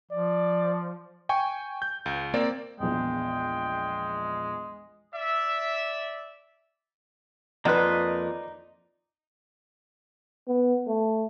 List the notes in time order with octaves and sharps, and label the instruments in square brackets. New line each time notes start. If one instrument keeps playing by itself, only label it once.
[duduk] F3 [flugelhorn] D5
[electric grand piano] G5 G#5 C#6
G6
C#2
A#3 C4 D5
[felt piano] A#1 E2 [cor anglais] G#3 [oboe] G5
[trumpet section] D5 E5
[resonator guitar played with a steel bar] F2 B4 [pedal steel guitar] A#3 F4 F#6 [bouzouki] D#4 [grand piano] D5
[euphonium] B3
A3